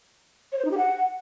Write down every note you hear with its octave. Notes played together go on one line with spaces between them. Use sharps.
C#5
C5
D#4
G4
F#5